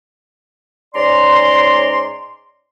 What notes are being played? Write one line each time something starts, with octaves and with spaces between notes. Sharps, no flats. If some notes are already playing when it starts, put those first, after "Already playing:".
G#2 C#4 D5 A#5 C6